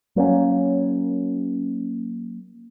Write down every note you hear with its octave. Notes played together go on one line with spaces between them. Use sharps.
F#3 A#3 C4 C#4